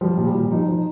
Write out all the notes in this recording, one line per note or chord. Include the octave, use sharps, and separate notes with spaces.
F3 G3
A#2
G3
A#2
F3 D#4
F3 D#4